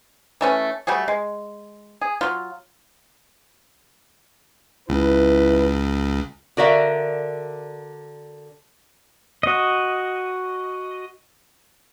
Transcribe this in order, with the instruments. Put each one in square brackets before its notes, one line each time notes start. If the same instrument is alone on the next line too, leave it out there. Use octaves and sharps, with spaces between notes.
[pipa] E3 A3 C#4
G3 A3 F#4 G#4
G#3
G#4
F#3 F4
[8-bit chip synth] C#2 [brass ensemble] E4 B4
[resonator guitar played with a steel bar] D3 F#4 A#4 D5 E5 F5
[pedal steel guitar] F#4 D#5